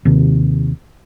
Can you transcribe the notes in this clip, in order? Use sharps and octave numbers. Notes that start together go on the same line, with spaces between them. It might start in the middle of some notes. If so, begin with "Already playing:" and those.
D#2 C3